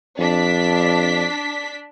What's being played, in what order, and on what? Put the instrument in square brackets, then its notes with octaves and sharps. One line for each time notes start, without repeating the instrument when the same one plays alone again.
[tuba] F2 [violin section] D4 B6